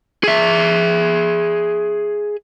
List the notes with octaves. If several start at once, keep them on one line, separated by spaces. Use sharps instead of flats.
G#4 E5